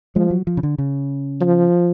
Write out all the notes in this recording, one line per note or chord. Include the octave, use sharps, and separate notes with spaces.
F3 G#3
F#3
F3
C#3
D3
C#3
F3